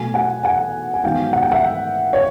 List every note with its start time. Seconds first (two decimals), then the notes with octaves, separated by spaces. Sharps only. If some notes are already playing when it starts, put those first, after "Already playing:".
Already playing: B2 F#3 A3 G#5
0.14 F#5 G#5
0.43 F#5 G#5
0.94 G#5
1.03 G#2 D#3 F#3 B3 F5 G5
1.33 F#5
1.43 G5
1.51 E5 F#5
2.13 C#5